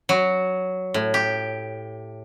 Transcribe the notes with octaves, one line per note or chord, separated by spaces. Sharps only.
F#3
A2
G4